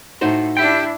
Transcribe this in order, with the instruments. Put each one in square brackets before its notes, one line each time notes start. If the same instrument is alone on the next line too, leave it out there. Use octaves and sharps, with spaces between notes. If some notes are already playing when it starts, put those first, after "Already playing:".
[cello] A2 [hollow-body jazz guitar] D#4 F#4 C5
[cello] D4 E4 [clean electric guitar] G4 G5